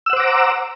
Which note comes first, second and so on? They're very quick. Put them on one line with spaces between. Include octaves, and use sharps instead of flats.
E6 F#5 C5 D6 A#5